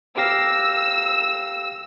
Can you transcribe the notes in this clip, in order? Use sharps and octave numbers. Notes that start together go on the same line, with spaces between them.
G4 F5 E6 A#6